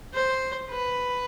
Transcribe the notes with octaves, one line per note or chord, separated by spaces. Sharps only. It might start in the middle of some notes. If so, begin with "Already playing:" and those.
C5
B4